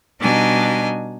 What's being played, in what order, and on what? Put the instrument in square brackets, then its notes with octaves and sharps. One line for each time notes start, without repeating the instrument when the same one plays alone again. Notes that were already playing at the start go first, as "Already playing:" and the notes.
[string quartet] B2 G3 D4 D#4 G#5